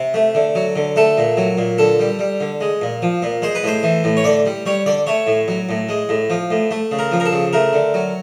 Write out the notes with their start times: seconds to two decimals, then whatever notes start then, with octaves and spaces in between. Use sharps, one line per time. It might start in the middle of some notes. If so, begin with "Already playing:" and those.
Already playing: C3
0.14 A3
0.35 D3
0.55 F#3
0.76 D3
0.96 A3 A4
1.17 A#2
1.37 F#3
1.57 A#2
1.78 D3 A4
1.99 G3
2.19 G3
2.40 D3
2.61 G#3
2.81 A#2
3.02 F3
3.22 A#2
3.42 G#3 C5
3.55 B4
3.63 A2 C5
3.83 E3
4.04 A2
4.17 C#5
4.24 D3 D5
4.46 G3
4.66 G3 C#5
4.86 D3 D5
5.07 A3 C#5
5.27 A2
5.48 F#3
5.69 A2
5.89 G#3
6.09 A2
6.30 F3
6.51 A2
6.71 A3
6.91 C#3
6.99 A#4
7.12 F3
7.20 A#4
7.26 A4
7.32 C#3
7.53 A3 A#4
7.73 D3
7.94 F#3